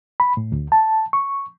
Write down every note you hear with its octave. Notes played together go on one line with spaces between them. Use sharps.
B5
A2
D2
A5
C#6